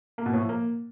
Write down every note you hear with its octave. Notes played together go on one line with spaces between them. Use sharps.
A#3
B2
A2
F3
A#3